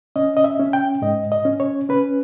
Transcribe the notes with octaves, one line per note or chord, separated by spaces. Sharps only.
C#4 D#5
D#5
E5
C#4
G5
G#2 D#5
D#5
C#4
C#5
C#4 B4